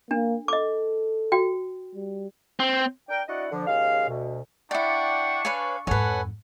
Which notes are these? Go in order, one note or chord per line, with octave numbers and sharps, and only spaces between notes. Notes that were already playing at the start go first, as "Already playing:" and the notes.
A#3 D4
A4 D#5 D6
F#4 G5
G3
C4
D4 A#4 G5
D4 E4 F#4 D5 D#5 F#5
D3 F3
D#2 C#3 G#3 F5
D2 B2
D4 E4 D5 F#5 G5 C#6
B4 C#5 F5 G#5
F2 G#2 A4 B4 C#5 F#5 G#5